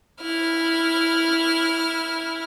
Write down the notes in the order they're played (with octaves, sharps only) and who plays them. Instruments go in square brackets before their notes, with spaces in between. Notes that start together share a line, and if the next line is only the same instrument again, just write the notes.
[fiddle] E4 F6